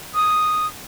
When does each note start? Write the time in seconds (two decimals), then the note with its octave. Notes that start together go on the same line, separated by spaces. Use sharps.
0.15 D#6